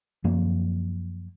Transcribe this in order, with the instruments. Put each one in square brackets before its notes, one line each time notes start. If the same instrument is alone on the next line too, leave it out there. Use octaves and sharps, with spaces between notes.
[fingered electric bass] F#2 F3 A#3